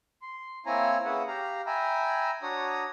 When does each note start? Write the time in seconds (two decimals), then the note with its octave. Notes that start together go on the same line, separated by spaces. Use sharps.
0.22 C6
0.66 A#3 C4 E4 C#5 G#5 A#5
1.05 A#3 C#4 G#4 B4 E5 F#5
1.28 G4 F5 A#5
1.66 E5 G5 G#5 A#5 B5
2.42 D4 F#4 C#5 A#5 D#6